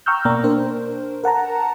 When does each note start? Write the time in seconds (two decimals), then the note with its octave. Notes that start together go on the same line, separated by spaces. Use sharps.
0.06 G5 A#5 C#6 E6 F6 G6
0.25 B2 A#3 D5 G5 A#5
0.44 D4 A#4 C5
1.24 A#4 F#5 A5 A#5